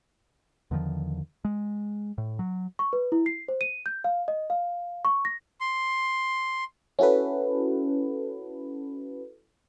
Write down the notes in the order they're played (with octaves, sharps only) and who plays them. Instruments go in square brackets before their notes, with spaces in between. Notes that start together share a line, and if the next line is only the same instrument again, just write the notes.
[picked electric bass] E2 D3 D#3 F3
G#3
A2
F#3
[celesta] C#6
B4
E4
C7
C5
D#7
G6
F5
D#5
F5
C#6
A#6
[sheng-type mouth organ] C6
[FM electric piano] C#4 E4 F#4 A4 B4